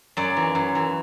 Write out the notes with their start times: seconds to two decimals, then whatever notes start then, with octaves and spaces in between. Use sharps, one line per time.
0.17 F#2 D5
0.37 E3
0.55 F#2
0.75 E3